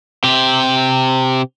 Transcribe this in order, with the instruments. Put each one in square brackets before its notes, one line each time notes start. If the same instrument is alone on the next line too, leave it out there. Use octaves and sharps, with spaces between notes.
[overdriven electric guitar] C3 G4